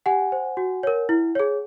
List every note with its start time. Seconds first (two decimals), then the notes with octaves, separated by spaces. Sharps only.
0.06 G4 F#5 G#5
0.32 C5
0.57 F#4
0.83 A#4 C#5
1.09 E4
1.35 G#4 C#5